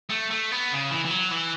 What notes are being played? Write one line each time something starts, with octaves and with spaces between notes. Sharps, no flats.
A3
A3
B3
C#3
E3
E3
F#3
E3